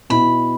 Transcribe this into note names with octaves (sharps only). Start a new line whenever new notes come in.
B2 B3 E4 B5